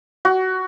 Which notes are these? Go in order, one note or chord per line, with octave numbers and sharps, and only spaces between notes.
F#4